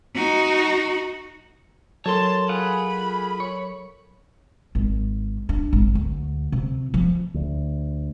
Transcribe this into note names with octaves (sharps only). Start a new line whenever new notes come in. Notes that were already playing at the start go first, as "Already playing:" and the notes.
D#4 F#4
F#3 A4 A#4 C#5 A5 C6
F4 G#4 F#5 B5
C#5
G#1
D4
G#1
D2
C3
F3
D2